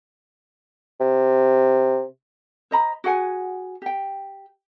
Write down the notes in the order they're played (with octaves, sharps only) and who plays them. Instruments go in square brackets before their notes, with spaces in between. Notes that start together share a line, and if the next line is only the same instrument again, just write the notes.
[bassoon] C3
[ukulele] C5 D#5 A#5 B5
F#4 G#4 F#5 G#5
G4 G5